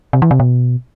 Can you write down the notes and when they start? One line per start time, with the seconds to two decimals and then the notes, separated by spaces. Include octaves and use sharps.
0.13 C3
0.22 E3
0.31 C3
0.40 B2